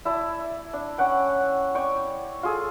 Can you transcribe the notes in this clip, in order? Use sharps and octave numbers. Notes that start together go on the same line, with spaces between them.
E4 D5 A5
D4
C#4 F#5 G5
C#5 D5 G5 C#6
F4 G#4 A4